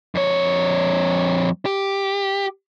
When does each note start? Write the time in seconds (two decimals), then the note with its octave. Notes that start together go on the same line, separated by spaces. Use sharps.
0.15 F2 C#5
1.66 G4